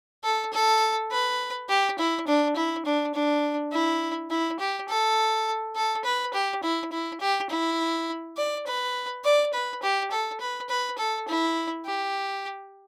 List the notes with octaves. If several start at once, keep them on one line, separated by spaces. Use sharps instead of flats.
A4
A4
B4
G4
E4
D4
E4
D4
D4
E4
E4
G4
A4
A4
B4
G4
E4
E4
G4
E4
D5
B4
D5
B4
G4
A4
B4
B4
A4
E4
G4